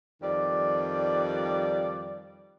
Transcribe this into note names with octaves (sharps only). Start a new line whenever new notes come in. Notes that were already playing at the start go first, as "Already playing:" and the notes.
F2 D#3 G3 D5